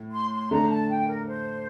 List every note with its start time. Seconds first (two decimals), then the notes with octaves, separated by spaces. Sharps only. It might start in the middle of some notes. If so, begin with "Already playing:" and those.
Already playing: A2
0.12 C6
0.31 C6
0.51 D3 A3 D4 A#5
0.69 A5
0.89 G5
1.08 A#4
1.27 C5